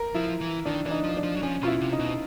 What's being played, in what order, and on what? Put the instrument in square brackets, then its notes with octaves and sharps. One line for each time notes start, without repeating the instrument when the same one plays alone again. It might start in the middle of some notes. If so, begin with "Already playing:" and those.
Already playing: [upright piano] A#4
[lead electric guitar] F3 [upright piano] E4
[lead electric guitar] E3
[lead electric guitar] D#3 [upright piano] D4
[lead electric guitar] E3 [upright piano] D4
[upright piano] D#4
[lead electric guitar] F3
[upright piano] D4
[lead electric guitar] F3
F#3
[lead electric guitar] F3 [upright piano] C#4
[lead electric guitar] B2 [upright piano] F4
[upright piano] E4
[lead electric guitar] C3
[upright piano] D#4
[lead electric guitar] B2